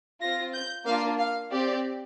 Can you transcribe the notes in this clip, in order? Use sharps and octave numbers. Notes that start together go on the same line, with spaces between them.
C4 F4 A#6
G6
A#3 D4 F4 F5
F5
C4 G4 D5